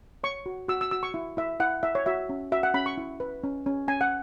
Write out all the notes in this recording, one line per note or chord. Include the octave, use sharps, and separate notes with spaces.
C#5 C#6
F#4
F#4 E6
E6
F#4 E6
C#6
E4
E4 E5
E4 F#5
E4 E5
C#5
F#4 E5
C#4
F#4 E5
F#5
C#4 B5
C#6
E4
B4
C#4
C#4
C#4 G#5
F#5